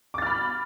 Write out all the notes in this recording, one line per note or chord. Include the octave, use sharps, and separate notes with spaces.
B5 D6 F6 A6